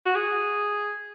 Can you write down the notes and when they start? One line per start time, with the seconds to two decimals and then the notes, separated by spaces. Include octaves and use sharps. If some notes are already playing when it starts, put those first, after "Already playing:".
0.06 F#4
0.15 G#4